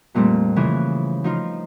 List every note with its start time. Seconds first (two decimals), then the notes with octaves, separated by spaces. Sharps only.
0.14 F2 A#2 G3 A3 C4
0.56 C#3 E3 F3
1.24 F3 D#4 F4